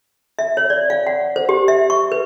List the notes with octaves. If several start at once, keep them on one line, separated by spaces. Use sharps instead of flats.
E5
C#5
D5
F5
F#5
C5
G4
E5
C#6
B4